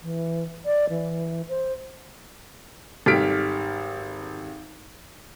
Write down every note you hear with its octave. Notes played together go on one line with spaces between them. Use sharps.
E3
D5
E3
C5
G#1 G3 A4 F6 B6 D7